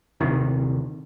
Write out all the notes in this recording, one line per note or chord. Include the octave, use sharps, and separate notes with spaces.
D#1 C3 D#3